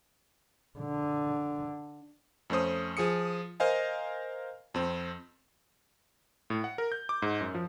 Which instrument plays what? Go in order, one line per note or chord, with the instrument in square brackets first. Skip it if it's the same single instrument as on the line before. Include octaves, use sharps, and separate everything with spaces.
[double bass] D3
[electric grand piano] F2 A3 C#4 C5 D#6
F3 G#4 D#6 C#7
A#4 C5 D#5 F5 G#5
F2 C4
A2
F#5
A#4
G6
D6
G#2
F#2
F3